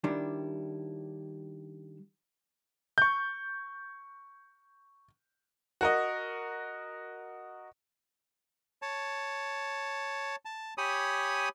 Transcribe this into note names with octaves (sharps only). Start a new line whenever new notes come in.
D#3 G3 D4 E4
C#6 G6
F#4 A#4 D#5
C#5 A5
A5
G4 C#5 G#5 B5 D#6